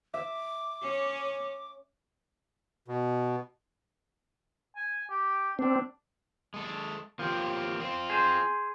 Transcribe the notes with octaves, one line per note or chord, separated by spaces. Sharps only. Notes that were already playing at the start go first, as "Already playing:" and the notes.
E5 D6
C#4 C#5
B2
G#5
G4
C4 D4
G#3 A4
F3 A#3 C4 G4
C4 F4
G#4 C5